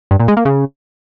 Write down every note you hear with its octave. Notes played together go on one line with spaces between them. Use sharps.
G2
A#2
G#3
A#3
C#3